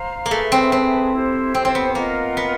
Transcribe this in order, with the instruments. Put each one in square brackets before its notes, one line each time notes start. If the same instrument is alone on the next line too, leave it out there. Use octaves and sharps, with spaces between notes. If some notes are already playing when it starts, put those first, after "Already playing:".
Already playing: [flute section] C5 F5 A#5
[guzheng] A#3
[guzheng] A3 [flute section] G#4 B4 E5 A5
[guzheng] C4
C4
[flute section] E4 G4 C5
[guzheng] C4
C4
B3
[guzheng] A#3 [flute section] F4 A#4 D#5 F#5
[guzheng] B3